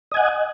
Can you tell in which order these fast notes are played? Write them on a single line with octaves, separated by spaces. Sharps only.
D#5 G#5 F#5